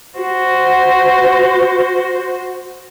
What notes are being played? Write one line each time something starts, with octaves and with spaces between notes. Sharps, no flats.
F#4 C5